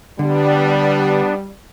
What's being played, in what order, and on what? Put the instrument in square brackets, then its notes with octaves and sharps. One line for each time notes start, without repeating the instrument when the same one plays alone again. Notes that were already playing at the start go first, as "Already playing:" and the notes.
[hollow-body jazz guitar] D3 [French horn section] G3 [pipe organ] B3 D4